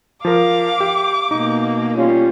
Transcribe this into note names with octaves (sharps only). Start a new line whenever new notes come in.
F3 A#4 F5 D6
G4
B2 A#3 D#4
G3 C#4 F4